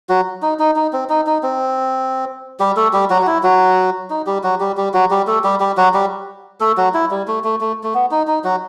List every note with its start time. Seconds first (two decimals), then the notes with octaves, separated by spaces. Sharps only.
0.09 F#3 F#4
0.42 D#4
0.59 D#4
0.76 D#4
0.93 C4
1.09 D#4
1.26 D#4
1.43 C4
2.60 G3 G4
2.77 A3 A4
2.93 G3 G4
3.10 F#3 F#4
3.22 F#4
3.27 E4
3.43 F#3 F#4
4.10 D#4
4.27 G3 G4
4.43 F#3 F#4
4.60 G3 G4
4.77 G3 G4
4.93 F#3 F#4
5.10 G3 G4
5.27 A3 A4
5.44 G3 G4
5.60 G3 G4
5.77 F#3 F#4
5.94 G3 G4
6.60 A3 A4
6.77 F#3 F#4
6.94 E4
7.11 G3
7.28 A3
7.44 A3
7.61 A3
7.83 A3
7.94 B3
8.11 D#4
8.27 D#4
8.44 F#3 F#4